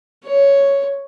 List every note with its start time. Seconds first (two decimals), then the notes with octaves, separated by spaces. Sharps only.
0.25 C#5